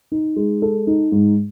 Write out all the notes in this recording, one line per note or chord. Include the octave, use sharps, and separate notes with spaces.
D#4
G#3
A4
D#4
G#2